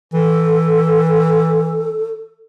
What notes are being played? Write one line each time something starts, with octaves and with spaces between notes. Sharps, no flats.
E3 A4